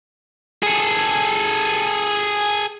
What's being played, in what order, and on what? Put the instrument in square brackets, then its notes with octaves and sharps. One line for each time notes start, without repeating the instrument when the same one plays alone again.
[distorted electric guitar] G#4 A4